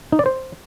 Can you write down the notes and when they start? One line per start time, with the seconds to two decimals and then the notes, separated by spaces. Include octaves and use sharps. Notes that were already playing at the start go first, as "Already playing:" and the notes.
0.12 D#4
0.19 D5
0.26 C5